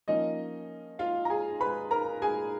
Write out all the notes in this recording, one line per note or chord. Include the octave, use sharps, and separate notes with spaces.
F3 A#3 C#4 D#4 D#5
F4 F5
A#5
G#4 G#5
B4 B5
A#4 A#5
G#4 G#5